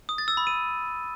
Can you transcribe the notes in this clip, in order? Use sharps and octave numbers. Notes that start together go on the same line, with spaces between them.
D#6
A6
E6
B5
D#7